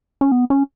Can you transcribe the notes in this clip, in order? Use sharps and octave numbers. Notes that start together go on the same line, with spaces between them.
C#4
B3
C#4